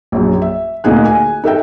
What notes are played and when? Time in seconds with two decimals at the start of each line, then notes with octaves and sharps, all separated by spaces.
0.12 A#1 F#2
0.42 E5
0.84 D2 A#2 A#3 D#4 G#4 F#6
1.05 G#5
1.44 D#4 A4 E5 G5